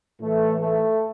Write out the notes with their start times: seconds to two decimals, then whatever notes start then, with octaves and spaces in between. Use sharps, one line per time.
0.20 A2 E3 A3
0.60 A3